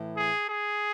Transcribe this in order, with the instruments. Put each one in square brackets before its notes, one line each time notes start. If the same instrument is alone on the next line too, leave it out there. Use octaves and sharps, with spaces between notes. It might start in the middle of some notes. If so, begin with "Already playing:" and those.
Already playing: [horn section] A2 E3
G#4
G#4